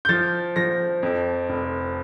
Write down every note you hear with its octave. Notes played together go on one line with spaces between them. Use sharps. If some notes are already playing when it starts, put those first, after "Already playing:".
G6
F3 A6
F3 A#6
F2
F1